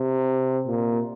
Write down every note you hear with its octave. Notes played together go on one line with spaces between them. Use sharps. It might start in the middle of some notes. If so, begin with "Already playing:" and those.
Already playing: C3
A#2